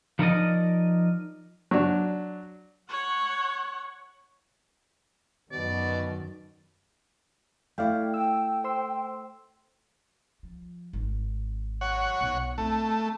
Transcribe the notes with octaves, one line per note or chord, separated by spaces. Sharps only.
F3 D#4 A#4 D5 D#5
F#3 D4
C#5 F#5
F#2 B2 D#3 D5
A3 E4 D5 F5 G5
G5 E6
C5 C6 E6
F3
G#1
C#5 F#5
B1
A3 C4